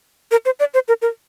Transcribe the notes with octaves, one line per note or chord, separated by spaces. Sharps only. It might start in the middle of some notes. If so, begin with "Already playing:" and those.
A#4
C5
D5
C5
A#4
A#4